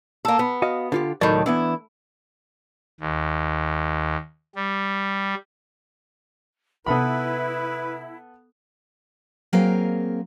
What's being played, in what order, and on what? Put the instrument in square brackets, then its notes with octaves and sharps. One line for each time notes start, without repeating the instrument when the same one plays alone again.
[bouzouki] A#3 A4
B3
[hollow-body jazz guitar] F#4 D#5 F5
D3 F4 G4
[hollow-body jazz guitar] C#2 F#3 D5 [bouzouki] A2 D#3
[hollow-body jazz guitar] E3 B3 D4 [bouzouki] E4
[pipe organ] D#2
G3
[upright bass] C3 D#4 [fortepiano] B3 A4 B5 [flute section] E4 [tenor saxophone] B4
[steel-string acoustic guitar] F#3 A#3 C4 G#4 A#4 F5